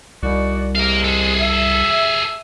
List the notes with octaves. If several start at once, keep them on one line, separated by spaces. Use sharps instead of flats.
C2 D#4 F#4 D5
C3 G#3 A#4 F5
G#4 A4
E5